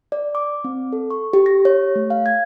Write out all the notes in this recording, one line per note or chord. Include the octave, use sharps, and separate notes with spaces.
D5
D6
C4
A4
C#6
G4
A#6
C#5
A3
F5
G#6